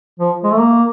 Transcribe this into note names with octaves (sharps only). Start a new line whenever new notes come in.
F3
G#3
A3
A#3